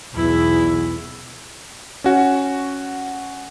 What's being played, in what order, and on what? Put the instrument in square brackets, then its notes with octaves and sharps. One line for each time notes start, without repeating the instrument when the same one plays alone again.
[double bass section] B1 E2 [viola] E4
[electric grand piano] C#4 F#4